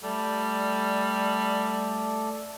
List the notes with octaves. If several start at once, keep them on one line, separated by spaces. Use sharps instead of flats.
G3 A3 A4 D5